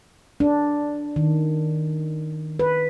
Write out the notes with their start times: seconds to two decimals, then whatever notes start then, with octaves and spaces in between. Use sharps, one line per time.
0.40 D4
1.16 D#3
2.59 B4